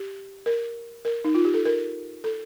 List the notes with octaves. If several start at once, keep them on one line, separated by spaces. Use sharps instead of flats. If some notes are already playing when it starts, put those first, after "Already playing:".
Already playing: G4
A#4
A#4
D#4
F4
G4
A4
A#4
A4